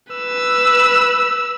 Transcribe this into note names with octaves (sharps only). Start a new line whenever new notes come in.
B4 E6